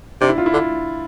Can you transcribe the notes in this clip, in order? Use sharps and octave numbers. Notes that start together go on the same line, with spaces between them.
C3 D4
E4
F4
E4
D3